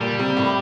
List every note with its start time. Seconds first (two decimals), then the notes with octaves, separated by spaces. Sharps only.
0.01 A#2 G3
0.19 C3
0.37 A2